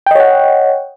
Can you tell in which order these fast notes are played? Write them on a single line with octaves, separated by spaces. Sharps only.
G5 D#5 C#5 F#5